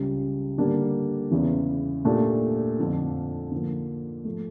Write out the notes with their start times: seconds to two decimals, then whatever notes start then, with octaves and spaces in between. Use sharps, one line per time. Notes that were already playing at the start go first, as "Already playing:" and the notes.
Already playing: C#2 C#3 G3
0.58 D3 G3 A#3 D4
1.31 E2 C#3 E3
2.05 A#2 A3 D4 G4
2.79 F2 D3 F3
3.52 D3 F3 A#3
4.25 F3 A3